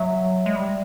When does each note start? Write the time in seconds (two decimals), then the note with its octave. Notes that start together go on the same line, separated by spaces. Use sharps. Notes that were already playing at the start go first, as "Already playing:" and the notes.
Already playing: F#3 E5
0.46 G#3
0.56 G3